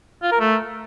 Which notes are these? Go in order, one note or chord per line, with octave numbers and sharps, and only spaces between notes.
F4
A#4
A3